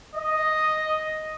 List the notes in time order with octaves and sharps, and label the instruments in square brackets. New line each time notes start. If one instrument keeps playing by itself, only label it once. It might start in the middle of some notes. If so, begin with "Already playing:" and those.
[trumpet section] D#5